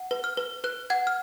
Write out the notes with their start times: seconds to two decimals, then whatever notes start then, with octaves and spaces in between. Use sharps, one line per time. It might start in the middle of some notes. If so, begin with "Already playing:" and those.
Already playing: F#5
0.11 B4
0.24 F6
0.37 B4
0.64 B4 F#6
0.90 F#5 G#6
1.07 F6